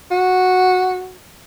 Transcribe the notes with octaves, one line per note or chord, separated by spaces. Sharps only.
F#4